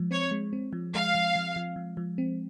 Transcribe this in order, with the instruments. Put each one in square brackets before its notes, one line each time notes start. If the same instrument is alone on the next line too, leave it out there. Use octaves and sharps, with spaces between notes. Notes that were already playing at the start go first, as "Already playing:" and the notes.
Already playing: [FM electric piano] F3 G#3
[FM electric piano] C4 [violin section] C#5
[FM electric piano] G#3
C4
F3
[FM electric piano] G#3 [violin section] F5
[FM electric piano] F3
F3
F3
F3
F3
C4